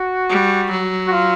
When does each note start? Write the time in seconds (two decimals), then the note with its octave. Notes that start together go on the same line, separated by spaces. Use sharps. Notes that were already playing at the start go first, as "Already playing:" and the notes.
Already playing: F#4
0.29 G3
0.71 F#3
1.07 F#4
1.12 F4